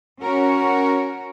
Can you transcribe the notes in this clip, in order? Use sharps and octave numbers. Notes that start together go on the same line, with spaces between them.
C#4 F#4 A#4 C#5